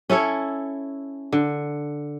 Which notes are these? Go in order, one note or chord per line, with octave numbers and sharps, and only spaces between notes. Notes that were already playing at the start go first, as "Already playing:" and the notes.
C#4 E4 A4 C#5
D3